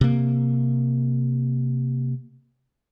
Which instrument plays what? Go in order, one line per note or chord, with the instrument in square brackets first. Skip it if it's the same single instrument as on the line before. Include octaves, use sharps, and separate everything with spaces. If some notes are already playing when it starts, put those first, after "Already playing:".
[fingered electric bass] C3 A#3